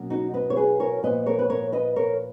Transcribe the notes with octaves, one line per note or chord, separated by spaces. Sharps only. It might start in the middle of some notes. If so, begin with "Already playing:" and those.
Already playing: B2 F#3 A#3 C#4
D#4 F#4
B4 D#5
C#5
G#4 B4
A#4 C#5
A#2 F3 B3 B4 D#5
A#4 C#5
B4
A#4 C#5
B4 D#5
A#4 C#5